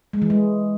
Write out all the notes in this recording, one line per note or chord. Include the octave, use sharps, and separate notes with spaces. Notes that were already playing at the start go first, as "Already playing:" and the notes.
G#3
E3
G#3